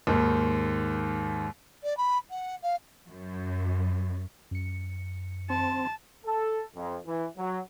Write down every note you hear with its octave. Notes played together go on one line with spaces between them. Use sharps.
D#2 G#2 D#3
D5
B5
F#5
F5
F#2
F#2 C#7
C4 A5
A4
F2
E3
F#3